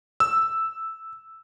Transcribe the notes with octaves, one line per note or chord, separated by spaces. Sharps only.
E6